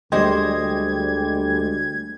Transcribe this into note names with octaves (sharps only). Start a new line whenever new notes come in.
D2 G3 G#3 G4 C5 D#5 G#6